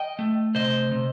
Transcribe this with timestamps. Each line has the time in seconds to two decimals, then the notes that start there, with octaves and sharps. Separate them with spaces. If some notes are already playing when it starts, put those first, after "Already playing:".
Already playing: D#5 G5
0.19 A3
0.55 C3 C5 D#5
0.91 C3